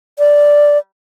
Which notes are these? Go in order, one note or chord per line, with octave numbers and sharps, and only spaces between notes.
D5